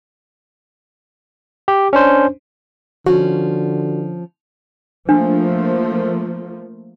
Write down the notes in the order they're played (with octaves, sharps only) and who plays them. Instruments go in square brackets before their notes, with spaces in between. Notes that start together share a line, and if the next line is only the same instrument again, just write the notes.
[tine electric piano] G4
C#4 D4 C5
[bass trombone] D3 [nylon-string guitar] F3 C#4 [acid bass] F#4
[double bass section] F3 A3 A#3 [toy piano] D4